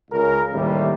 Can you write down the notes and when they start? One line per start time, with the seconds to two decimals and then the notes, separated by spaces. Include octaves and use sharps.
0.11 C#2 C#3 A#4
0.52 D#2 A2 C3 E3 G3